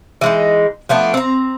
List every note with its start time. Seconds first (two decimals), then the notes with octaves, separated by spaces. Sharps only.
0.21 E3 G#3 D#4
0.89 F3 A3 B3 D4
1.14 C4 A#5